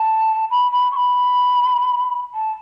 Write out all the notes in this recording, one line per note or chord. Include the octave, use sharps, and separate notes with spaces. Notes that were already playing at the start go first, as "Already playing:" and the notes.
Already playing: A5
B5
B5
C#6
B5
A5